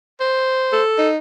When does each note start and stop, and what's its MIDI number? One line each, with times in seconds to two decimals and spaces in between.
0.21 0.82 72
0.73 1.09 69
0.98 1.17 63